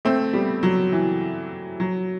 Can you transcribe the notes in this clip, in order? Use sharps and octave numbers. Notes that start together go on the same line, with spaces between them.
A3 C4
G3 B3
F#3
E3
F#3